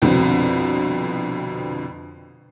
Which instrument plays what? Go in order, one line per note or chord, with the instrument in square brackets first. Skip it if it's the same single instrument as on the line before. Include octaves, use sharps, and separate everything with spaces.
[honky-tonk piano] C2 F2 B2 D3 C4